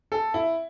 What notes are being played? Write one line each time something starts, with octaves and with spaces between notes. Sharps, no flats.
A4
E4